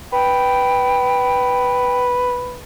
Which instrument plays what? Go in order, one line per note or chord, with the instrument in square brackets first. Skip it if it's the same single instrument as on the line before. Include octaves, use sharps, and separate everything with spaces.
[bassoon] B4 [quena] G5